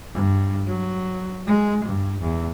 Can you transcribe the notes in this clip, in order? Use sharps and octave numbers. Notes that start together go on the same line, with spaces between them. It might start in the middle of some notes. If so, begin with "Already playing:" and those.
G2
F#3
G#3
G2
E2